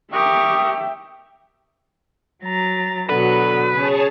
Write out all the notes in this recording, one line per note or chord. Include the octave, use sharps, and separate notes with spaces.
G4 A#4 E5 G5 C#6 D#6
F#3 A#5 A6
B2 D3 F#3 B3 B4
C#3 G#4 C#5 A5